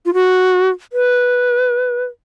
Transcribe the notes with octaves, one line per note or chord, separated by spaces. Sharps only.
F4
F#4
B4